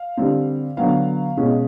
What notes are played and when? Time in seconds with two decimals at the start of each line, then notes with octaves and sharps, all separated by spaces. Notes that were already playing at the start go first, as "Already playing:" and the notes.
Already playing: F5
0.17 D3 G3 C4
0.77 D3 F#3 B3 F5
1.37 B2 G#3 C#4